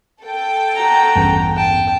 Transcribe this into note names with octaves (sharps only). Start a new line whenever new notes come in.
A4 G5
F#4 A#5
A1 E2 G2
G5 A5